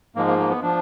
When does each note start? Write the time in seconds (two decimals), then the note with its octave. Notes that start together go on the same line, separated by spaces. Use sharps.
0.16 G#2 F3 G#3 A#3
0.27 A#3
0.39 A#3
0.50 B3
0.62 F3 D4